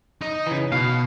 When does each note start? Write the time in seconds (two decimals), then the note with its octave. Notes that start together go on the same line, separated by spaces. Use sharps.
0.21 D#4 D#5
0.47 C#3 E3
0.72 B2 F5